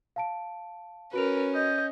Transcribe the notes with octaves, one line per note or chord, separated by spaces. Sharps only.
F5 A5 D7
C#4 F#4 A#4 B4 D7 F7
D#5 G6